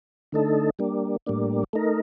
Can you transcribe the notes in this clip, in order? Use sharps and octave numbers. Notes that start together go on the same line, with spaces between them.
D3 A3 D#4 A4
G3 A#3 D4
A2 G3 A#3 D4
A3 D#4 A#4